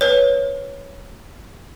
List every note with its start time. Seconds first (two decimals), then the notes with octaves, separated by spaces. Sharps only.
0.01 B4 C#5